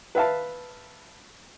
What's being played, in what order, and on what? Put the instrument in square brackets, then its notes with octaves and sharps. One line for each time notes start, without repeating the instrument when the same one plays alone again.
[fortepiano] B4 E5 F5 A5